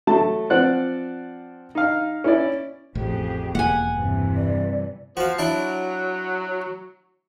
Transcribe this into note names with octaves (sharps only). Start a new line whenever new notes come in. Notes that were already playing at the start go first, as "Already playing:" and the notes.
F#3 A3 A5
F3 C4 D5 F#5 F#6
D#4 F5
C#4 E4 D5
A1 F2 G4 G#4
E1 A#3 F#5 G#5
G2 C3 E3
D5
F3 F#4 F5
F#3 D4 E4 A5